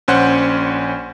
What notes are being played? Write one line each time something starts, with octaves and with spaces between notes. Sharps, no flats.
A#1 C#4 C5 F#5 F#6 G6